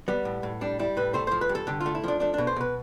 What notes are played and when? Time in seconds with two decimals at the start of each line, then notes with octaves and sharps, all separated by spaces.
0.08 G3 B3
0.25 A2
0.43 A2
0.61 G3 D4
0.79 G3 E4
0.97 A2 B4
1.14 A3 C5
1.27 F3 C5
1.41 B4
1.49 G2
1.55 A4
1.67 D3 G4
1.80 F4
1.86 A3
1.95 E4
2.04 F3 D4
2.20 A3 D4
2.34 B2 D4
2.47 C5
2.56 B2 B4